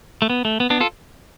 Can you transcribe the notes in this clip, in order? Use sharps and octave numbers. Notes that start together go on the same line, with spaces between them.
A3
B3
A3
B3
B3 D4
F4 A4